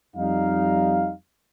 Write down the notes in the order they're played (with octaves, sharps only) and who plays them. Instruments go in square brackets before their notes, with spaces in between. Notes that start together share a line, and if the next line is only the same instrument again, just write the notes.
[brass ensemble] F2 G3 D#4 F5